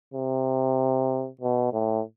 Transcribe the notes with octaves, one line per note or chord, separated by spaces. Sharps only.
C3
B2
A2